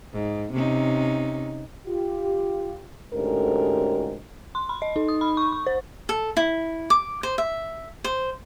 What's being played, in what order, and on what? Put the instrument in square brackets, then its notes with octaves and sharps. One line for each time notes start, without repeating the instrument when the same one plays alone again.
[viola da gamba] G#2
C3 C#4 D#4
[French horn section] F4 G4
D2 G#2 C#4 G4 A4 A#4
[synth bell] C6
B5
D#5
D#4
D#6
B5
C#6
C#6
C5
[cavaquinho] A4
E4
D6
C5
E5
C5